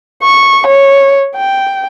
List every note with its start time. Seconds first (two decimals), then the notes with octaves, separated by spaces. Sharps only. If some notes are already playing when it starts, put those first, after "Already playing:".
0.23 C#6
0.66 C#5
1.36 G5